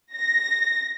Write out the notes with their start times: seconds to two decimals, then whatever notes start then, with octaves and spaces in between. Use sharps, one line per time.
0.15 A#6